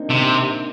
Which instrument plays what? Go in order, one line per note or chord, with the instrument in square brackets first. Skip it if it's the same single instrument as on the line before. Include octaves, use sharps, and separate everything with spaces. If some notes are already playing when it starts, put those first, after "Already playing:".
Already playing: [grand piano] A#3 C4 D4 D#4
[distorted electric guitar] C3